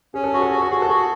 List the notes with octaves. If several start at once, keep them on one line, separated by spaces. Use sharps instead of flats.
C#4 G#4
A4
F#4 G#4
A4
F#4 G#4
A4
F#4 G#4
A4
F#4 G#4